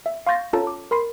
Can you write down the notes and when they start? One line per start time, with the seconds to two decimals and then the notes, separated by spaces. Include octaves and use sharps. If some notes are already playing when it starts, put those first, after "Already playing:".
0.06 E5
0.27 F5 C6 C#6 G6 A6 A#6
0.53 C#4 F4 A4 C#5 A5 A#5
0.67 D6
0.91 A#4 B5 C6 C7